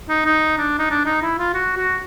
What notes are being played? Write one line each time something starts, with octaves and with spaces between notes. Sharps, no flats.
D#4
D#4
D4
D#4
D4
D#4
E4
F4
F#4
F#4